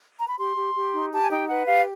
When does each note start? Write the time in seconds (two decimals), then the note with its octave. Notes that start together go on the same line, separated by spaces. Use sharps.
0.17 A#5
0.28 B5
0.38 G4 C6
0.56 G4
0.75 G4
0.94 D#4
1.12 G4 A5
1.22 G#5
1.30 D#4 G5
1.49 B4 F#5
1.67 G4 F5